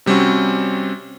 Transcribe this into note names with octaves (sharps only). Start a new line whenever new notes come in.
C3 G3 C4 C#4 F#4